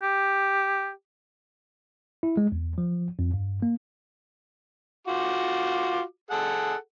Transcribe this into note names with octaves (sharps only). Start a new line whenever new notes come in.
G4
E4
G#3
E2
F3
F2
G2
A#3
F4 F#4 D6
G#4 A4 F#5